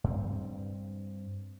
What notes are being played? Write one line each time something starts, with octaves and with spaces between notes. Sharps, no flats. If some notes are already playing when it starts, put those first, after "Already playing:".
G2 C4